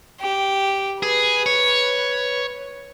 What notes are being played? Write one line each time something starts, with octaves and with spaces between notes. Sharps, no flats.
G4
G#4 B4
C#5